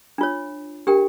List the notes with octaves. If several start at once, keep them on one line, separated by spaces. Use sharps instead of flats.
D4 F4 C#5
D4 G4 A#4 G5